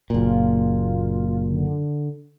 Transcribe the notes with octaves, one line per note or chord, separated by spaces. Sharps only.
F#1 A#2 F4
D3